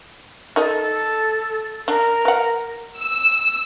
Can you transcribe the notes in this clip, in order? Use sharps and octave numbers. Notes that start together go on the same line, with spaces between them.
D#4 A4 A#4 D#5
D4 A#4
B4 F#5
E6